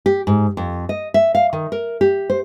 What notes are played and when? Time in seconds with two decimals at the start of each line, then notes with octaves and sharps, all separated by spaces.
0.06 G4
0.27 G#2
0.57 F2
0.89 D#5
1.14 E5
1.35 F5
1.53 D#3
1.72 A#4
2.01 G4
2.30 C5